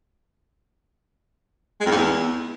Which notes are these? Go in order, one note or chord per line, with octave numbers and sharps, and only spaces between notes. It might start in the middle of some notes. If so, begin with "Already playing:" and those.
G#3
F2
G#2
E2